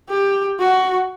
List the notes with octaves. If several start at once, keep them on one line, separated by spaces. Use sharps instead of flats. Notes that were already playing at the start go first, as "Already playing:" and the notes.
G4
F#4